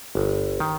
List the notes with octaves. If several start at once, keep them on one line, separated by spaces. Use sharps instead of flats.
G1
D#3